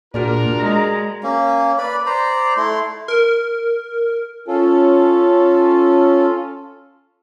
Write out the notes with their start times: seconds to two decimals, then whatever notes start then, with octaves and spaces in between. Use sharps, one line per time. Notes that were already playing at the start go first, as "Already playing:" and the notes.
0.14 A#2 D4 F4 F#4 G#4 A#4 D5
0.60 G#3 A#5
1.23 A#3 C#4
1.78 B4 D5 B5
2.06 C5 D5 A#5
2.57 A3 E4 C6
3.08 A#4
4.48 C#4 F4 A4